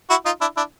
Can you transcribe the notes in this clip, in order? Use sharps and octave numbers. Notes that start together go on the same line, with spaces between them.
E4 F#4
D#4 F4
D4 E4
D4 E4